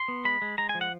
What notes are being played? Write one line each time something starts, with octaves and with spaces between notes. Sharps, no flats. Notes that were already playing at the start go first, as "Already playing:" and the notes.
Already playing: C6
B3
G#3 B5
G#3
G#3 A#5
G#5
F3
F#5